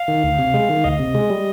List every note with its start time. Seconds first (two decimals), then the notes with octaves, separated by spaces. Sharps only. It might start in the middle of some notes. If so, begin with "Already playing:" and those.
Already playing: F5
0.08 D#3
0.23 D2
0.39 C3
0.54 G#3
0.69 D#3
0.84 D2 D#5
0.99 C3
1.15 G#3
1.30 G3